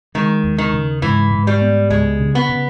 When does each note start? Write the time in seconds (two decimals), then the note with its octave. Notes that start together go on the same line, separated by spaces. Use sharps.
0.15 D#3 G#3
0.44 D#2
0.58 D#3
0.74 C#3
1.02 G#2 E3
1.32 G#2
1.47 G3
1.62 B3
1.90 C#2 G#3
2.20 C#3
2.35 B3
2.49 C#3